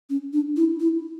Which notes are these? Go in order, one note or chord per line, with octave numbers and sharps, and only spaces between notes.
C#4
D4
E4
E4